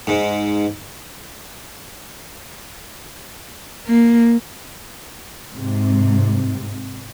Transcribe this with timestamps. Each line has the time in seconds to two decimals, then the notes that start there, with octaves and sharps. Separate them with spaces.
0.07 G#2
3.87 A#3
5.55 G#2 C3